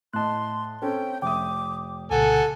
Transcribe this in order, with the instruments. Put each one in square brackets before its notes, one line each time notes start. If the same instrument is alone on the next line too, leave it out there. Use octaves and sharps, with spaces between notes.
[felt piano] A2 D#5 [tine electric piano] A5 F#6 [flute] C6
[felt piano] C4 C#4 A4 [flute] G5
[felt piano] F1 E5 D#6 [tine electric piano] G5 [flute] D6
[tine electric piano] C2 A#2 C#3 [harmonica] A4 G#5 [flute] F#5